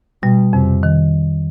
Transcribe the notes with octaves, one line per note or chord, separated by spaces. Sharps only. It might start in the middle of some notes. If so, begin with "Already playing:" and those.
B2 G3
F2 C3
D#3